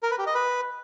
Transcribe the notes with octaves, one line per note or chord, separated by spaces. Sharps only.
A#4
B4
G4
D#5
B4